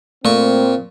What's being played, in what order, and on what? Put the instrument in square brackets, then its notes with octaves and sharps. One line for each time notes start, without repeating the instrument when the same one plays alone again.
[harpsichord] A#2 C#6 [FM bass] A3 [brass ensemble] A#3 C4